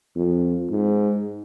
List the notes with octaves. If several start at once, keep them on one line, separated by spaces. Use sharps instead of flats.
F2
G#2